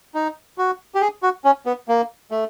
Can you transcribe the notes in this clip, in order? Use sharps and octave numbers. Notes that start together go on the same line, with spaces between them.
D#4
F#4
G4
G#4
F#4
C#4
B3
A#3
A3